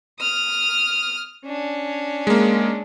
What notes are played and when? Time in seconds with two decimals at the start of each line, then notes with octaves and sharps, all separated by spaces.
0.20 D#6 F6
1.45 C#4 D4
2.27 G#3 A#3